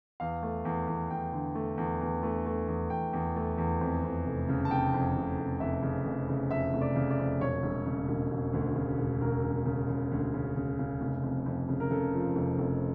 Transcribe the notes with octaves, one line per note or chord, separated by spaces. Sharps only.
E2 F5
A3
E2
E2
E2 G5
D3
A3
E2
E2
A3
A3
E2
E2 G5
E2
A3
E2
F2
F2
F1
C#3
A5
F1 G5
F2
F1
F1
F1 E5
C#3
F1
C#3
F2 E5
F1
D5
C#3
D5
F2
E1 C#5
E1
C#3
E1
E1
D2
C#3
E1
E1 A#4
E1
C#3
C#3
D2
C#3
C#3
C#3
F1
F2
F2
C#3
A#4
C#3 A4
F3
F1
F1